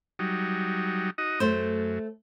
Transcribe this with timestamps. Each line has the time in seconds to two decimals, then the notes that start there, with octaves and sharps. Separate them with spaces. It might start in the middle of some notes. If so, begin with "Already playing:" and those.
0.19 F#3 G3 D#4
1.18 D#4 F#4 D#5
1.40 F#2 A3 C5